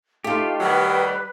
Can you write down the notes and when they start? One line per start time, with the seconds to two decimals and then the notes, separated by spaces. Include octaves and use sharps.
0.24 A3 D#4 F4 G4
0.60 D#3 F#3 G3 B4